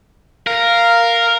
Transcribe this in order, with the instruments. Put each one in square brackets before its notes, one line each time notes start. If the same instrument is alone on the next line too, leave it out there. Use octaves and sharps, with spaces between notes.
[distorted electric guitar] A#4 [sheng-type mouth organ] F5